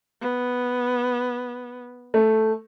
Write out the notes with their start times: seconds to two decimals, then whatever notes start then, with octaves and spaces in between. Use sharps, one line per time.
0.21 B3
2.14 A3